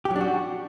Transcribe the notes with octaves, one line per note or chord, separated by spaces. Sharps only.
G4
F#3
D4
F#4